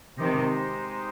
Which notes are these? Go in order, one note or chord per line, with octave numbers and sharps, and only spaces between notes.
C3 D#3 G#3 D#4 G4 C5 D#5